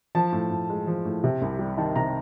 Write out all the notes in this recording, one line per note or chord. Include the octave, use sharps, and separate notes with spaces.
F3 A5
A2
A2
G#3
F3
A2
C3
C2
G3
D#3 A5
C3 A#5